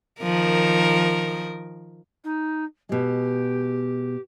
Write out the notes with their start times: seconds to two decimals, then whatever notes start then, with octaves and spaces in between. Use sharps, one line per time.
0.22 D#3 F3 A#4
2.24 D#4
2.89 B2 G#3 G4